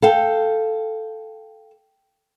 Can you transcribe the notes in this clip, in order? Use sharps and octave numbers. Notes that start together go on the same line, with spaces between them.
A4 F5 G5